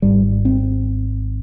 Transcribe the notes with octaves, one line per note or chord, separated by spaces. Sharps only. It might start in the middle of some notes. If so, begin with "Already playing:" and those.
G#1 G#2 G3
C4